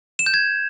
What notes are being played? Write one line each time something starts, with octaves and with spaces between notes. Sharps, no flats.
E7
G6
G#6